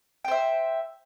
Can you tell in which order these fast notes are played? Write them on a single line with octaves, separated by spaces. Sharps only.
G5 C5 E5